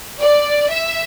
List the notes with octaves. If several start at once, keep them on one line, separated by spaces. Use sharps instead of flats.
D5
E5